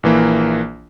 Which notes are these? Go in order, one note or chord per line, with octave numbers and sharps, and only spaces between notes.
A#1 E3 A#3